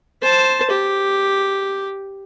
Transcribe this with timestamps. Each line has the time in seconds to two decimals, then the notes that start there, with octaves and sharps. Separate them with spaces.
0.23 C5 A5
0.71 G4